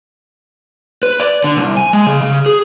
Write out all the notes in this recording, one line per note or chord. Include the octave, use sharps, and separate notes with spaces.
B4
D5
D3
C2
G#5
G#3
C#3
C#3
G#4